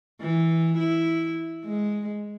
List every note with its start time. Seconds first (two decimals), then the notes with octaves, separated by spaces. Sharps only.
0.21 E3
0.78 E4
1.64 G#3